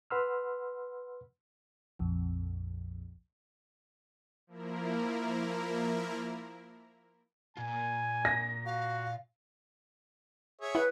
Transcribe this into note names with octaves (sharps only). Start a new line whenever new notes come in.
B4 F#5 B5 C6 E6 F6
A#1 F2
F3 A#3 E4 A#4
A#2 F4 G#5
A#6
F#4 F5
G#4 C#5 E5
E4 B4 F#5